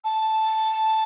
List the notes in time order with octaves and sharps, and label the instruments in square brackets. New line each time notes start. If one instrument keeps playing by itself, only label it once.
[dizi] A5